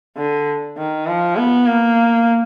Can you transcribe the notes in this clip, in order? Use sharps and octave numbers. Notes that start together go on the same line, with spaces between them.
D3
D#3
F3
B3
A#3